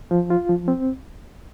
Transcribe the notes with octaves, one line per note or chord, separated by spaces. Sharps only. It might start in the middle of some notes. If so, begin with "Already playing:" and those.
F3
F4
F3
C4